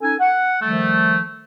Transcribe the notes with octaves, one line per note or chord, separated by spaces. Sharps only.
C#4 D#4 A4 G#5
F#5
D#3 F3 G3 A3